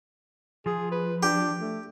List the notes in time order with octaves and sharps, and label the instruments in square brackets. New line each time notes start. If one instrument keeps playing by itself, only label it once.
[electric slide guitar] F3 [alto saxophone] G#4
[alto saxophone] B4
[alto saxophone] D4 [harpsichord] G4
[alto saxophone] A3